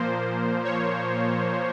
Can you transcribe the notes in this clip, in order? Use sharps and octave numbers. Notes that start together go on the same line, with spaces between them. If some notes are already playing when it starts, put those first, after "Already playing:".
Already playing: A#2 F3 A#3 C5
C#5